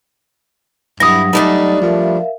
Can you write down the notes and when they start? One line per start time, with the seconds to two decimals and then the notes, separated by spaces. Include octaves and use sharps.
1.00 G2 F#3 E4 F#5 D#6 A#6
1.33 G3 A3 D4 D#4
1.82 F3 A#4 E5 F5